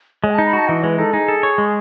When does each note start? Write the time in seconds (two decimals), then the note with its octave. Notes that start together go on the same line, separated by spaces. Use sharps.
0.23 G#3 C#5
0.30 G#5
0.34 D#4 A5
0.46 B5
0.53 F#4 A5
0.68 E3 D#5
0.84 G#3 B4
0.98 D#4 A4
1.13 D#4 G#4
1.28 A4
1.43 C#5
1.58 G#3